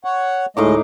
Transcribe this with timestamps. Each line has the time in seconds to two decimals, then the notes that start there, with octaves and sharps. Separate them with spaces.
0.04 C#5 F#5
0.57 D2 A2 G#3 D#4 D#5 D6